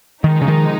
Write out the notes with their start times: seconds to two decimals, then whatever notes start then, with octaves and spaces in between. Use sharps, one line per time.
0.24 C3 D#3 F3 G#3 D#4
0.42 C#3
0.48 D#3